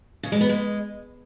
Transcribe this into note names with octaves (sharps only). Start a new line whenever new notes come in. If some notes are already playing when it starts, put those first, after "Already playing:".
C#3
G#3
B3
G#3